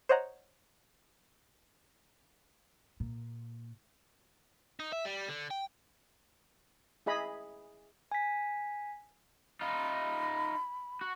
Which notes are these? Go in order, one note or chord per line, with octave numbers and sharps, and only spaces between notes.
C5 C#5 D#5 F#5 A#5
A#2
D#4
E5
G3
D3
G5
E4 G#4 D#5 B5
G#5 B6
D#4 F4 B5
F#4